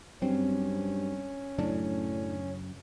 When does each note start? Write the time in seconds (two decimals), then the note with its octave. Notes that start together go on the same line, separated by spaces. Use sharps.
0.22 G2 F#3 C4 C#4
1.58 F#2 A2 C#3 F#3 D4